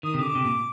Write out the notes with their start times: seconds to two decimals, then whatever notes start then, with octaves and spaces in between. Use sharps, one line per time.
0.03 D#3 D#6
0.14 C3
0.19 D3 D#6
0.23 D6
0.35 C3
0.45 A#2